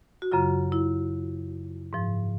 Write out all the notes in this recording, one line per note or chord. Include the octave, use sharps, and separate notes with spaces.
F#4
F#2 C#3 F#3 F4
E4
G#2 F3